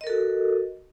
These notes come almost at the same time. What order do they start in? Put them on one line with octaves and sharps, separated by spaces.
D#5 A#4 A4 F#4